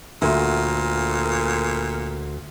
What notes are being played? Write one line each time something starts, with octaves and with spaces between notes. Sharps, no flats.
D2 A#2